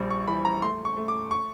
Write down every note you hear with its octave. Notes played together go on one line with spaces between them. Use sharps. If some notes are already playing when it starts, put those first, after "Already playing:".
Already playing: A#1 G3
C#6
E3 B5
A#5
A3 C6
C#6
A3
D6
C#6